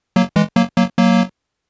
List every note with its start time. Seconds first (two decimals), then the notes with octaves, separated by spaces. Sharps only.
0.16 F#3 A#3
0.36 E3 G#3
0.56 F#3 A#3
0.77 F#3 A#3
0.97 F#3 A#3